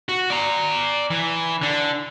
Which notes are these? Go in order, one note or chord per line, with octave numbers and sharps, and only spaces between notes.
F#4
D5 A#5
E3
D3 D4